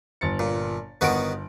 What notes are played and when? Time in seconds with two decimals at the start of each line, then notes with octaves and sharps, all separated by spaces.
0.21 G1 A6 C#7
0.39 A#2
1.01 G1 D#3 B3 F#4 D7